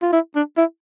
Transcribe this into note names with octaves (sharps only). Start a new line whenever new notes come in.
F4
E4
D4
E4